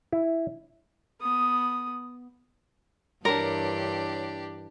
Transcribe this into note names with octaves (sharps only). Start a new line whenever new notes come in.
E4
B3 D#6
G2 E3 D4 G4 A#4 C#5